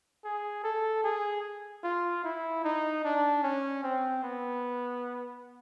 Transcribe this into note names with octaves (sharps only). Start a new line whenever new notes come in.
G#4
A4
G#4
F4
E4
D#4
D4
C#4
C4
B3